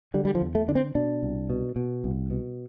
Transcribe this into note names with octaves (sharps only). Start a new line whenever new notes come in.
D3 G3
G3
F3
E2
A3
D3 D4
C4
B2 D4
C2
B2
B2
C2
B2